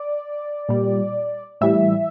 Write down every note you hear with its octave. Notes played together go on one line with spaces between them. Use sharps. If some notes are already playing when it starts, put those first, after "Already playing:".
Already playing: D5
A#2 G3
A2 E3 G3 E5